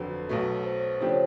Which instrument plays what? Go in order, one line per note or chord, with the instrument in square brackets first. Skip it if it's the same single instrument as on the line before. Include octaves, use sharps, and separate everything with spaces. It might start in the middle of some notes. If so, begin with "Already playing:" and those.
Already playing: [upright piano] G1 F2 D3 F#3 [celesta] B4
[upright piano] B1 B2 F#3 A3
[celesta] C5
[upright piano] C#3 F3 A3 D4 G4 [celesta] C5
[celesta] C#5